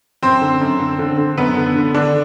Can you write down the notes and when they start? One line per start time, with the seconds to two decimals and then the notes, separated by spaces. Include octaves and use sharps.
0.23 F#2 C4 C5
0.41 D3
0.61 F#2
0.80 D3
0.99 D3
1.18 D3
1.37 F#2 B3 B4
1.57 D3
1.76 D3
1.94 D3 D4